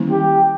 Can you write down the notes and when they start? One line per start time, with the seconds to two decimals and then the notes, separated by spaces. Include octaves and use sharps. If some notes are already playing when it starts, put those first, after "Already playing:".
Already playing: D#3 G3 A#3 C#4 E4
0.10 G4